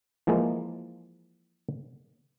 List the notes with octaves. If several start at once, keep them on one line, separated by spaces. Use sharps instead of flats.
E3 F3 G#3 A#3